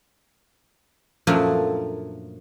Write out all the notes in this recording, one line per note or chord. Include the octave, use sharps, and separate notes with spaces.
F#2 A#2 F3 F#3 A3 D4